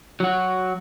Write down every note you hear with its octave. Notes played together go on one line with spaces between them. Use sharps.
F#3 F#4